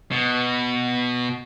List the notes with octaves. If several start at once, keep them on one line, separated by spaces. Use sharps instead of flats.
B2